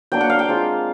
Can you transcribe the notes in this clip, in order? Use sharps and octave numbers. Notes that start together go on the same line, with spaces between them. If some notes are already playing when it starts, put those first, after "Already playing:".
F#3 A#3 D4 G5
F#5
F5
G5
G#3 C4 F4